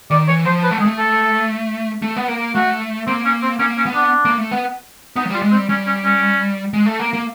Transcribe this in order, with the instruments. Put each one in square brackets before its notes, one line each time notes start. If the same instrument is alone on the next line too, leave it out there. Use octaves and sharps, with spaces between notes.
[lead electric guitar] D#3 [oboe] D5
[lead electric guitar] E3 [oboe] C#5
[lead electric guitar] F3 [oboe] C5
[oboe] B4
[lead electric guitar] A3
[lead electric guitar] G#3 [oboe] G#4
[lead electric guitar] A3
[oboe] A4
[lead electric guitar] A3
B3
A#3
[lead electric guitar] A3 [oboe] F#4
[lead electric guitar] A#3 [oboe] C4
[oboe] C#4
C4
[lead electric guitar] A#3 [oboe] C#4
[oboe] C#4
[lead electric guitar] B3
[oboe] D4
[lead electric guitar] A#3
A3
B3
[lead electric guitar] B3 [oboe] D#4
[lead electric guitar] F#3
[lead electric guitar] G3 [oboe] F4
[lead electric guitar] G#3
[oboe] C4
[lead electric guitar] G3
[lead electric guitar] G3 [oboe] C#4
[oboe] C#4
C#4
[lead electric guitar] G#3
A3
A#3
A#3